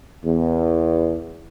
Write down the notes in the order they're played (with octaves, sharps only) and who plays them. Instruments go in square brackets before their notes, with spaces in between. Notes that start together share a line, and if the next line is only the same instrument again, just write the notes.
[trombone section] E2